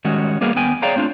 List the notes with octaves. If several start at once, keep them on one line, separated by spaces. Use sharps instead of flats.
D#3 G3 G#3 C#4 F#4
G3 A#3 B3 G#4 A#4
D#2 B3 G5 G#5
G#4 C#5 D5 F5 G5 A#5
A3 C4 D4 F4